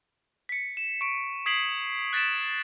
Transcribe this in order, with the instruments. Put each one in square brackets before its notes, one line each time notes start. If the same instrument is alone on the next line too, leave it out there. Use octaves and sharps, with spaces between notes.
[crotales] B6 C#7
E7
C#6 D7
D#6 G#6 B6 C7 D7 F#7
F#6 A6 B6 D7 E7